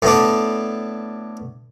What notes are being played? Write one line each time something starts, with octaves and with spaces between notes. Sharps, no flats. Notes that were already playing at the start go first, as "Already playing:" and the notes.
A2 B3 D4